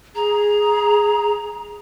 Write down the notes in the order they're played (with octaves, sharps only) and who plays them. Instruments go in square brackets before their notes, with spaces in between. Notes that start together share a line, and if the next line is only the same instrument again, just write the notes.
[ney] G#4 [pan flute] A#5